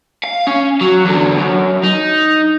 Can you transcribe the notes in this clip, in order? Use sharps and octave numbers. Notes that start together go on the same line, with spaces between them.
F5
C#4
F#3
E2 D3
F#2
D#4